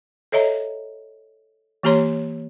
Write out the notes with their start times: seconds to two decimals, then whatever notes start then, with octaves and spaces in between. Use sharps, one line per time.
0.32 A4 C#5 D#5 E5 A#5
1.83 E3 A#3 G4 C#5 A#5 C6